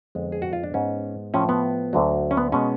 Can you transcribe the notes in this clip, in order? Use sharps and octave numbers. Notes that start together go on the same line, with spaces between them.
F2 D3 G#3 B3
G#4
F#4
F4
D4
G#2 G#3 B3 C#4
A2 F3 A3 C#4
B3
D2 D3 F#3
C#4
B3
B2 G#3 B3 C#4